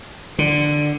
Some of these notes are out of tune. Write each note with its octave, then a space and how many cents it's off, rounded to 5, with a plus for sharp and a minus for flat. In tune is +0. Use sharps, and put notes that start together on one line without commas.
D3 +10